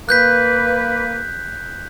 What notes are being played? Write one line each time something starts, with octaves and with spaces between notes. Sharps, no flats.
A#3 B4 F#6 G6 B6